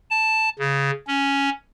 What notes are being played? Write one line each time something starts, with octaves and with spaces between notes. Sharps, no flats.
A5
C#3
C#4